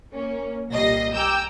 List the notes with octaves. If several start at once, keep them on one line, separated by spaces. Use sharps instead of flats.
A#3 C#4
C2 A#2 G3 D#5 A#6 C7
G5 G#5 A#5 D6 E6 G6